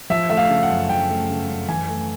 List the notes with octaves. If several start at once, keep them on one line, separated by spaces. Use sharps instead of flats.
F3 E5
A3 E5
F5
C#3
F#5
F#2
F3 G5
A3
C#3
F#2
E3 G#5
A3